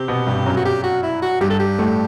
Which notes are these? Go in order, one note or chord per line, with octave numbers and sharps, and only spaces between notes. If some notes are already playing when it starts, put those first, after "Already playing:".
Already playing: C3 C4 G4
B2 B3
G2 G3
F#2 F#3
F#4
G4
F#4
E4
F#4
G2 G3 G4
A4
G4
A2 A3